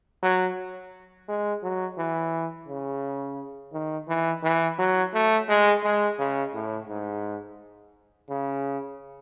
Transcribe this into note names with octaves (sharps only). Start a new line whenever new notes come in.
F#3
G#3
F#3
E3
C#3
D#3
E3
E3
F#3
A3
G#3
G#3
C#3
A2
G#2
C#3